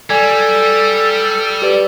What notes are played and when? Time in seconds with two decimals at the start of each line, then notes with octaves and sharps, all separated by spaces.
0.10 G3 A4 D5 G#5 G#6
1.62 G4 B4 D5